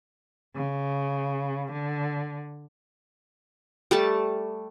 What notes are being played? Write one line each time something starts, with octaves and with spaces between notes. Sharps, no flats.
C#3
D3
G3 A3 A5